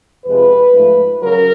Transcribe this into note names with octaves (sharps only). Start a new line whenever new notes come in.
F2 C3 F3 G#3 B4
G#2 F3 A3
C#3 F#3 A#4